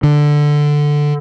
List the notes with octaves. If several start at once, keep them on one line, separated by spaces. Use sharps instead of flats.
D3